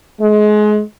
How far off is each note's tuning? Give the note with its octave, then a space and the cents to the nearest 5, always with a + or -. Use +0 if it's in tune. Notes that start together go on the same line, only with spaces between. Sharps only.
G#3 +25